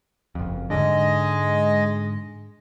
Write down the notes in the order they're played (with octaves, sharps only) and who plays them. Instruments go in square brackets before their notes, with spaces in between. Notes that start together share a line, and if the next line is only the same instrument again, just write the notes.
[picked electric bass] F#1 F2
[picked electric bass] G#2 D3 [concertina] G#3 D#5